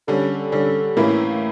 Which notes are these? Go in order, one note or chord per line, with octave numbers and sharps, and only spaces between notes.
D3 G3 C#4 A4
D3 G3 C#4
A2 E3 A#3 C#4 E4